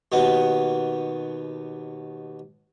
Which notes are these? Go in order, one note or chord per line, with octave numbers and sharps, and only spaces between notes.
D#2 B2 B3